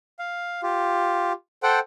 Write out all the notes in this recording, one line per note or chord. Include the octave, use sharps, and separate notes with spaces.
F5
F4 G4
A4 C5 F#5 G5